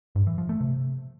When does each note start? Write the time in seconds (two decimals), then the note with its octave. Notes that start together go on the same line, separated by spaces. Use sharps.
0.15 G2
0.27 E3
0.38 F3
0.49 A3
0.61 C3